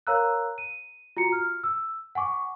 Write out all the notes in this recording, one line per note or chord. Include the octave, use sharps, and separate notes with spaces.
A#4 C#5 F5 A#5 E6 F#6
D#7
F4 F#4 A#5 C#7
F6
E6
F#5 G#5 C#6 D6